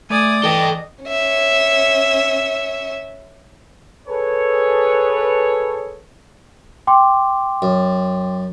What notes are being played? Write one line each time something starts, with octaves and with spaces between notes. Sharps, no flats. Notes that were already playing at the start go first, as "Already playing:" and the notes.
A3 D5 G#5 D#6
E3 A4 D#5 G5
C#4 E5
G#4 A4 B4 C#5
G5 C6 D6
F#2